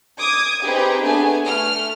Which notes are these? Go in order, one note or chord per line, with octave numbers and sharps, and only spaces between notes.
D6 D#6 G#6
C4 D#4 G4 G#4 B4
A3 B3 D4 G#4 G#5
A3 F6